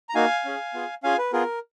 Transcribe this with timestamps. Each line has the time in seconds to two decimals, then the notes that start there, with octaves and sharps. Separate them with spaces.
0.09 A#5
0.15 A#3 D#4 F#4 F5 G#5
0.45 C#4 G#4
0.74 B3 F4 G#4
1.03 C#4 F4 G#4 F5 G#5
1.18 B4
1.33 B3 F4 G#4 A#4